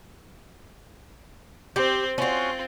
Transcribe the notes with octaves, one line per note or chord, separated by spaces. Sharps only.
C4 G4 C5
C4 C#4 F4 F#4